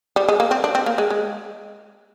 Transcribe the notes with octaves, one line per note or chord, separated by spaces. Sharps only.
G3
G#3
A#3
C4
D4
C4
A#3
G#3
G#3